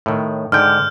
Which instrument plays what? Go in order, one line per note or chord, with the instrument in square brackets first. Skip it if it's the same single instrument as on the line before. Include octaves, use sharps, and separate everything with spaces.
[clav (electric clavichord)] A2 D#3
[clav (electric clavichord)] G#2 D3 G5 [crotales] F6 G6